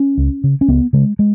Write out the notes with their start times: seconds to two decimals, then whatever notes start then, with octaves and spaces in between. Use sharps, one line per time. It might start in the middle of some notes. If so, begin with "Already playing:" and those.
Already playing: C#4
0.17 C#2
0.44 C#3
0.61 C#4
0.68 C#2 B3
0.93 C#3 G#3
1.19 G#3